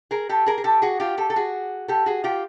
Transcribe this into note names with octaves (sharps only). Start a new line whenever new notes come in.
G#4 A#4
G4 A4
G#4 A#4
G#4
G4 A4
F#4 G#4
F4 G4
G4 A4
A4
F#4 G#4
G4 A4
F#4 G#4
F4 G4